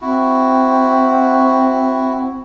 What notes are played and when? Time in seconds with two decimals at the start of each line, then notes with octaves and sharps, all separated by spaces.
0.01 C4 E4 F#4